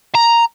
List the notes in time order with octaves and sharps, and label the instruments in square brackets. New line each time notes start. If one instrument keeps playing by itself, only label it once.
[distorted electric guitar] A#5